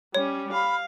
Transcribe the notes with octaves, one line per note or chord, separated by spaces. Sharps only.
G3 C#4 C#5
F5 B5